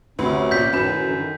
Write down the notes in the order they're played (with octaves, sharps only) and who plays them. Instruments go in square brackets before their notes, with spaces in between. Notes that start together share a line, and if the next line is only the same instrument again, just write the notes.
[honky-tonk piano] D2 C4 B4 [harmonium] C3 C#4
[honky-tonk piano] A#1 A#2 [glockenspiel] G6 B6
[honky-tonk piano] F#2 B4 E7 [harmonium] A2 D#3
[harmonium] G2 D3 E3
D#3